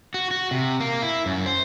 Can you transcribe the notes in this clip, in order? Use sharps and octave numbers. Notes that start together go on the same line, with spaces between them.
F#4
F#4
C3
A#3
E4
F#2
C5